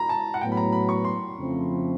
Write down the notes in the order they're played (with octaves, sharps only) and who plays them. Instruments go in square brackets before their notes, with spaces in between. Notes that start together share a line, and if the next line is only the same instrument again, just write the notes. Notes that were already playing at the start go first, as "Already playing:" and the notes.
Already playing: [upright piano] A#5 B5
A5
F#5
[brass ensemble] A2 F#3 B3 [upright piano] G5
[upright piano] B5
A#5
B5
C#6
C6
[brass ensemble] F2 C#3 F3 A3 C4